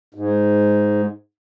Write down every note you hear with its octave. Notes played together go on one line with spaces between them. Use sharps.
G#2